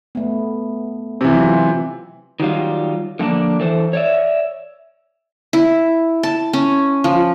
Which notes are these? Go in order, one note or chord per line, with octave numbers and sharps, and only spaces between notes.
A3 B3
C3 E3
F#3 F4
D#3 F#3 G3 F4
D3 F3 A#3 D4
E3 A4 C5
C#5 D5 E5
E4
A5
C#4
F3